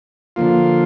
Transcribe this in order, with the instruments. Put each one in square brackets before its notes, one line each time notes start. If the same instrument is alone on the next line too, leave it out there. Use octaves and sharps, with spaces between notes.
[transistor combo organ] D3 F3 A#3 F4